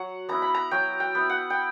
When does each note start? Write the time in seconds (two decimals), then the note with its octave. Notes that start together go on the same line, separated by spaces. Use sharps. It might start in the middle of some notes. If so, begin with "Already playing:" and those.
Already playing: F#3 F#5
0.29 B3 E4 A#5
0.42 B5
0.54 A#5
0.71 F#3 G5
1.00 G5
1.15 B3 E4
1.30 F#5
1.50 G5